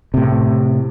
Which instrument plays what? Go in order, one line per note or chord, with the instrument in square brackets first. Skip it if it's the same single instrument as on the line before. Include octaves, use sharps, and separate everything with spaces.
[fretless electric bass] A2 C3